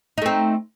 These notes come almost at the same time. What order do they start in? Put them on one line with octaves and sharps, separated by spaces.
D#4 A3 C4